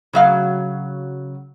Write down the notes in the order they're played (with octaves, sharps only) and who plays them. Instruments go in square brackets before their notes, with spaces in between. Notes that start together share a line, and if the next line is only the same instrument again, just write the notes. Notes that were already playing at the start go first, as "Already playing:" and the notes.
[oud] C#3 F#3 F5